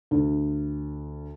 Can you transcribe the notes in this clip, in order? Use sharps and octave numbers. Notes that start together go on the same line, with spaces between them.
D2